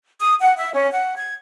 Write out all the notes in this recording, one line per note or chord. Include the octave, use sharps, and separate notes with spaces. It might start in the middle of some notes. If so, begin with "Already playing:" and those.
D#6
F#5
E5
C#4
F#5
G#6